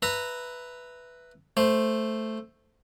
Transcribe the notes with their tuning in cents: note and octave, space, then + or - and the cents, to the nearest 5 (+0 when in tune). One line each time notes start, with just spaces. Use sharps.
B4 +0 E5 +0 A#5 -15
A3 +0 C5 +0